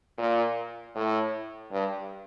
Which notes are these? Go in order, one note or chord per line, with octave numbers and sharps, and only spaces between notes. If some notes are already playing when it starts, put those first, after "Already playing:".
A#2
A2
G2